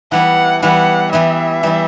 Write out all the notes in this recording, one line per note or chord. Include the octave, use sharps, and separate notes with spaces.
E3 G3 B3 E4 F#5
E3 G3 B3 E4 F#5
E3 G3 B3 E4 E5
E3 G3 B3 E4